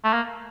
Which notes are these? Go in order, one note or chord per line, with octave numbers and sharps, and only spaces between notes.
A3
A#3